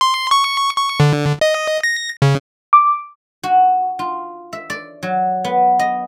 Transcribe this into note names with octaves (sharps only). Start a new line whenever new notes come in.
C6
C#6
C#6
D3
D#5
A#6
C#3
D6
F#4
F4
E5
D5
F#3
B3
D#5